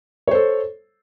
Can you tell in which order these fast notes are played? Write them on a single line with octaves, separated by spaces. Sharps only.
C#5 C5 A4